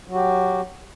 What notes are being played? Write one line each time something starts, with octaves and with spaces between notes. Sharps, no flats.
F#3 F#4 G4